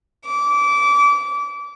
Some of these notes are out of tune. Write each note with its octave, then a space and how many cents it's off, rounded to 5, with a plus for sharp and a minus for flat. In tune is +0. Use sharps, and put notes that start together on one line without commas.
D6 -25